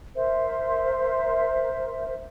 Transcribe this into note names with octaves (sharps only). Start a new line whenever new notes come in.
A#4 C5 E5